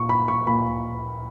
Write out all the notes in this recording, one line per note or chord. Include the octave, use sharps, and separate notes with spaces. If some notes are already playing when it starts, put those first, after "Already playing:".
Already playing: A#2 C#6
B5
C#6
A#2 B5